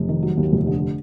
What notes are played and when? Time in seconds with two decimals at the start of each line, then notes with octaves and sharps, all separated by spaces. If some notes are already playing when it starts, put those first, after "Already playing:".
Already playing: F1
0.09 D#3
0.23 F#3
0.37 D#2
0.52 F1
0.67 D3